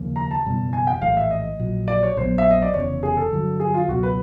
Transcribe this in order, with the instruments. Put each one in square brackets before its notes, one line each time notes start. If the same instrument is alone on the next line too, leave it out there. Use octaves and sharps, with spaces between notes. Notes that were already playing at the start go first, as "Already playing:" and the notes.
Already playing: [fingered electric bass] D#2 C#3 F3 A#3
[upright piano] A#5
A5
[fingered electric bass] F#1 E2 B2 G3
[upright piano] G#5
G5
[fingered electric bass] A#1 A2 E3 A3 [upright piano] F5
[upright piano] E5
D#5
[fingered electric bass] A#1 A#2 F#3
[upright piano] D5
C#5
[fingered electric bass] A#1 A#2 F#3 B3 [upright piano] C5
[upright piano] E5
D#5
D5
[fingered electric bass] F1 E2 C#3 [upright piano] C#5
[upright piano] G#4
A4
[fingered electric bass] G2 D3 F#3
[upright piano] G#4
F4
[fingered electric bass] C#2 B2 F#3 [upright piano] F#4
[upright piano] B4